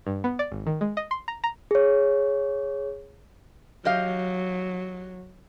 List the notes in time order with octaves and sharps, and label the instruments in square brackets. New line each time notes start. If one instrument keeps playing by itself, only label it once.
[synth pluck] G2
B3
D5
G#1
D#3
G#3
D#5
C6
A#5
A#5
[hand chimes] G#4 C#5
[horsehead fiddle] F#3 [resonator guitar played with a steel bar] G4 D#5 F5